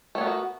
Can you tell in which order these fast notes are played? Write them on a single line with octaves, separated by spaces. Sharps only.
A3 C#5 B3 A#4 F#4